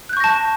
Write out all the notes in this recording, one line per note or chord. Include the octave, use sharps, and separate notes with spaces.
A5 C#6 F#6 G6 A#6